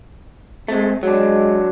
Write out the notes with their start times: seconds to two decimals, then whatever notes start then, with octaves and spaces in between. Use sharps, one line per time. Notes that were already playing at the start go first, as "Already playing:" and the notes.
0.68 G#3 A3 C4
1.03 F#3 G#3 D4